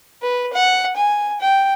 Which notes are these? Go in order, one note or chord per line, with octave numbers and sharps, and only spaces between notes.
B4
F#5
G#5
G5